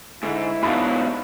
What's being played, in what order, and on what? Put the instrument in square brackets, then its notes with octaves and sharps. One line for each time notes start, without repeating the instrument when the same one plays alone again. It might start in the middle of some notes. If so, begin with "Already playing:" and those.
[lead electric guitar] G#2 [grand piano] D3 [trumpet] E4
[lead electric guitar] G#2 B2 [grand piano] D4 D#4 F#4 [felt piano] F5 B5